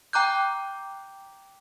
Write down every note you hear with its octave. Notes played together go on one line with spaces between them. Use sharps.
G5 A#5 D6 F#6 G6